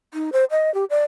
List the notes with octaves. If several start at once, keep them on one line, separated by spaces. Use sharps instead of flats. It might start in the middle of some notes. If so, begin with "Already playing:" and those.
D#4
C5
D#5
G4
D5